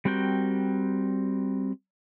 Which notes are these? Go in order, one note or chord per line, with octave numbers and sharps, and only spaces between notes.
G3 C4 F#4 A#4 G5